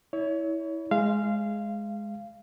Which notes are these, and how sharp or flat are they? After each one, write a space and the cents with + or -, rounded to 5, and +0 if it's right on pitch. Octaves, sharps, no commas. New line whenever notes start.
E4 -20 C#5 +25
G#3 +5 F5 -20